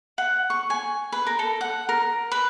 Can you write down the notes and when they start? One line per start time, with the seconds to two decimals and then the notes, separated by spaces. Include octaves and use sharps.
0.18 F#5
0.50 C#6
0.70 G#5
1.12 B4
1.27 A#4
1.39 A4
1.61 F#5
1.89 A#4
2.31 B4